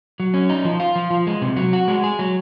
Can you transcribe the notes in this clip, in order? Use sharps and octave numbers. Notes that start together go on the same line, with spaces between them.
F#3
C#4
D#4
F3
F4
F3
F3
G#3
C3
F#3
F#4
G#3
G#4
F#3